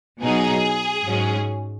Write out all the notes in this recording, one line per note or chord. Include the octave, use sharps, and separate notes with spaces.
B2 F#3 D#4 G#4
G#2 F#3 C#4